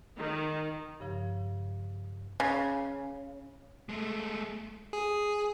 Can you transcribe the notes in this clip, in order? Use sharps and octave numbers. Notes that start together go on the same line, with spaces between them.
D#3
G2 C#3 F3
C#3
G#3 A3
G#4